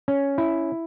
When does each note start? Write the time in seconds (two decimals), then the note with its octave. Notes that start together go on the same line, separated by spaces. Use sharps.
0.08 C#4
0.38 E4